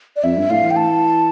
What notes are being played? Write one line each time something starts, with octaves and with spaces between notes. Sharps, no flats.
D5
F2 E5
G2
A2 F5
E3
G5
A5